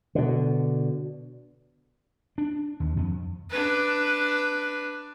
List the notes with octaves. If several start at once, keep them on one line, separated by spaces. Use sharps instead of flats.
B2 D3
D4
D#2
F2
D4 B4